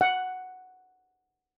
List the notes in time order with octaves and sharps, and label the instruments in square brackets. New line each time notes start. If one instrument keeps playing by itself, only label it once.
[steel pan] F#5